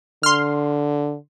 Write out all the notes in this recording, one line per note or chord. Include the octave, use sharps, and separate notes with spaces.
D3 C6 F6